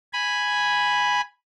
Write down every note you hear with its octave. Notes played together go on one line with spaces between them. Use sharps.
G#5 B5